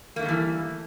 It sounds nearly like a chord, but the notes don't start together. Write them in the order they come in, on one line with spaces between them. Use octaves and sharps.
A#3 A3 D#3 G3 E3